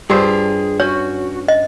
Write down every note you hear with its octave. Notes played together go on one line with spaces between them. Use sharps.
G2 F4 G#4 C5 G5
C#4 F#4 C#5
D#5